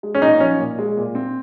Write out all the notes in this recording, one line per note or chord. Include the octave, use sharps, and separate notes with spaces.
G#3
C#4
A#2 D#4
F3 C#4
A#2
G#3
A#2
C4